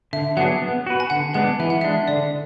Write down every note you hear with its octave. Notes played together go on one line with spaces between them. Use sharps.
D3 E5
F#3 B3 D4 G#4 F#5
B3
F#4 B4
G#5
D3 F#5
G#3 B3 D4 F#5
E3 E5
F#5
G#3 D4 E5
D3 D5